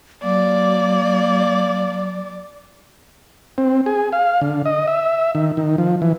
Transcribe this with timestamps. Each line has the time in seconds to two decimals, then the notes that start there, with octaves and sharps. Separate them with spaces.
0.23 F#3 A#3 D5
3.58 C4
3.86 G#4
4.12 F5
4.41 D3
4.66 D#5
4.87 E5
5.35 D#3
5.57 D#3
5.78 F3
6.02 E3